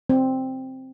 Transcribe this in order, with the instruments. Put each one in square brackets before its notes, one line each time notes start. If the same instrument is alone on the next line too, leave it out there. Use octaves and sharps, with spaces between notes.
[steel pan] C4